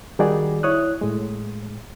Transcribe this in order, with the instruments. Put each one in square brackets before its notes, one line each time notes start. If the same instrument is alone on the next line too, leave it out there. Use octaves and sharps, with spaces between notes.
[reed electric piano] D#3 G3 D#4 F#4 G#4 D5
E4 C#5 D#6 F#6
A2 G#3